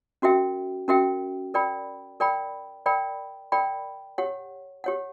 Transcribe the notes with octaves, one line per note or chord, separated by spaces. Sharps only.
C#4 F#4 A#4 E5 G5
C#4 F#4 A#4 E5 G5
A#4 D5 G5 B5
A#4 D5 G5 B5
A#4 D5 G5 B5
A#4 D5 G5 B5
G4 C#5 F#5
G4 C#5 F#5